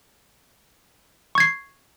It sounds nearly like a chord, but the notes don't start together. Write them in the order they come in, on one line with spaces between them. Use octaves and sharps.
C#6 G#6 C7